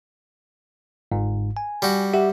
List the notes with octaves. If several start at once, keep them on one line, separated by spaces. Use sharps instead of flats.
G1 G#2
G#5
G3 F#4
G4 E5 F#5